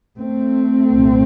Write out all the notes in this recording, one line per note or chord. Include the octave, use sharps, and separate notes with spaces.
A3 C4
C2 A#2